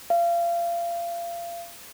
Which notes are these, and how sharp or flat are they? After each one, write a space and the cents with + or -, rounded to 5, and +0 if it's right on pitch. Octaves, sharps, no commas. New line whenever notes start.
F5 -30